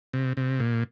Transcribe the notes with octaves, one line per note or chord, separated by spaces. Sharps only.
C3
C3
A#2